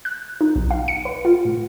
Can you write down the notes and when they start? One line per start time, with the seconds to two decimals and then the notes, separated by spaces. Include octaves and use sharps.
0.05 F#6
0.41 D#4
0.56 B1
0.71 F5
0.88 C#7
1.05 B4
1.25 F4
1.45 A2